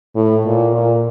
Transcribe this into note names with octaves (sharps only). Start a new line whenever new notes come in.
A2
A#2
A#2